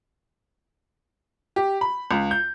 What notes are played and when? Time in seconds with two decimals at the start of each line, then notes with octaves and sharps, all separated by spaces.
1.56 G4
1.81 B5
2.11 C#2
2.31 G6